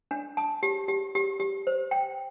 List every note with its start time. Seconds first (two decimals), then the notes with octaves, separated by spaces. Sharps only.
0.11 D4
0.37 A5
0.63 G4
0.88 G4
1.15 G4
1.40 G4
1.67 C5
1.91 G5